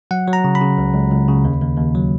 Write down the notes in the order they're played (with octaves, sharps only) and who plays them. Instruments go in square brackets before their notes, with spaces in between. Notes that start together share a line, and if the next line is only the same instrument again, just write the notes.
[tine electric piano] F#3 F#5
F#3
A#5
C#3
B5
C#3
C#2
C#2
C#2
C#3
D#2
D#2
D#2
F#3